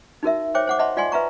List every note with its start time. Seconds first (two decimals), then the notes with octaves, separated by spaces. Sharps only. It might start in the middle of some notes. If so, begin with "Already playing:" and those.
0.23 D#4 F#4 A#4 E5
0.55 C5 C#5 E5 G5 D6
0.67 C5 F#5 D6
0.79 D#5 E5 F#5 A5 B5 C6
0.97 F4 D5 F#5 G#5 C6
1.12 B4 E5 F5 A#5 C#6